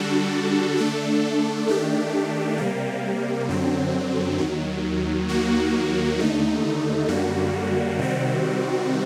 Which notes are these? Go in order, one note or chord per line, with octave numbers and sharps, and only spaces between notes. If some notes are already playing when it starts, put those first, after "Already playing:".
Already playing: D3 G3 D4 F#4 A4
D3 A3 D4 A4
D#3 A3 D4 G4
C3 G3 A#3
F#2 D3 F#3 C4
D#2 D#3 F#3
D#2 D#3 F#3 A#3 F#4
D#2 D3 A3 D#4
F#2 D3 G3 A#3 F#4
C3 D#3 G3 C4 F#4